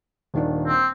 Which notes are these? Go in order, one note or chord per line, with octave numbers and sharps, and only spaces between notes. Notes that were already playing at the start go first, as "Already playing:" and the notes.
D#1 D#3 D4
C4